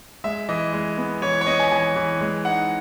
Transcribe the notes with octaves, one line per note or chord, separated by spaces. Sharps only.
G#3 E5
E3 D#5
G#3
B3
E3 C#5
C#5
B3 D#5
G#5
E3 G#5
E3
G#3
D#4 F#5